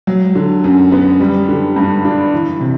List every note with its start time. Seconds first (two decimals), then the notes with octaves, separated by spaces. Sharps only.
0.07 F#3
0.35 D3
0.64 F#2
0.92 B3
1.20 G3
1.48 D3
1.76 G2
2.05 D4
2.33 E3
2.61 C3